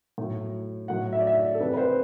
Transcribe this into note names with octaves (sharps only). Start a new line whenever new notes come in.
A2 F#3
A2 F#3 F#5
E5
D5
E5
A4
C3 E3 G3 B4
B4
C5